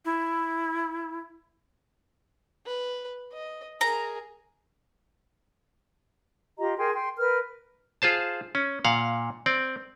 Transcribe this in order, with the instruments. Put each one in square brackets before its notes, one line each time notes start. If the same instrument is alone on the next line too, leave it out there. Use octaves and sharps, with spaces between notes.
[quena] E4
[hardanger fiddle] B4
D#5
[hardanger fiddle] G#4 A#4 [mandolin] A#5
[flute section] F4 G4 D#5 A#5
G#4 A#4 G5 C6
G5 C6
A#4 B4 F6
[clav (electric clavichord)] F4 G#4 C5 A5
C#4
A#2 F5 F#5
C4 D5